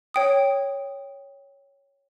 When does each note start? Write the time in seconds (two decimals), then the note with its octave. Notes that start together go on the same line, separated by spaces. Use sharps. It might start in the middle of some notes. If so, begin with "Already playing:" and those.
0.14 C#5 G5 D#6